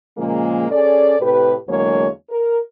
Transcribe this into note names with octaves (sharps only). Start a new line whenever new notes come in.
A#2 C#3 F3 G#3 A#3
C#4 G#4 A4 D5
A2 C3 G4 B4
E2 D3 F#3 G#3 A#3 C#5
A#4